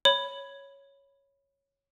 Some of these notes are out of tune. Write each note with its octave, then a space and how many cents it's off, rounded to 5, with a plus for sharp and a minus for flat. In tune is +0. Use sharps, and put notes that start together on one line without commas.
C#5 +0 B5 +0